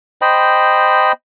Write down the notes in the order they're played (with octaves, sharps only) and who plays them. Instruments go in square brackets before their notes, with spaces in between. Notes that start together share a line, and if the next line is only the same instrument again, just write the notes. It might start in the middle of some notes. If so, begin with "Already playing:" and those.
[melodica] C5 D#5 G5 B5